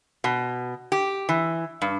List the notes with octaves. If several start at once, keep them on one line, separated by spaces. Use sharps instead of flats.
B2
G4
E3
G2